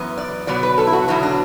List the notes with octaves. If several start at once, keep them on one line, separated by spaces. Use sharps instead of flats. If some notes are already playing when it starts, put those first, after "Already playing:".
Already playing: F#2 E3 B3
D5
B2 F#3 B3 D5
B4
A4
E4
F#4
E2 B2 F#3 B3 E4
D4